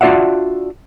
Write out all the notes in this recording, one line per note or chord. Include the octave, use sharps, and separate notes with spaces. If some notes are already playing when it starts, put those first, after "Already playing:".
D4 F4 F#4 D5 E5 F#5